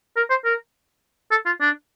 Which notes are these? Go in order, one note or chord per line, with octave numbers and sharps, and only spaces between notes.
A#4
C5
A#4
A4
F4
D4